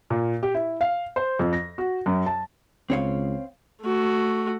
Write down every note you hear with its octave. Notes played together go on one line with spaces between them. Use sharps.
A#2
G4
E4
F5
C5
F2
A#6
F#4
F#2
A5
C#2 C4 C#5 F5
A3 F#4